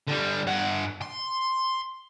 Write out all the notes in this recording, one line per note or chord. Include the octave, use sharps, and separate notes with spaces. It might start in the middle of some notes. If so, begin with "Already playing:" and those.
D3 G3
G2 F#5
C6